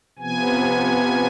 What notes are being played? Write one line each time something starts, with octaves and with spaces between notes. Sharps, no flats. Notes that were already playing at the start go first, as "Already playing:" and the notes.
C3 F3 B3 G#5